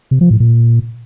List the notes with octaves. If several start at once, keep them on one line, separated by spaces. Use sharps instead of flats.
C3
F3
A2
A#2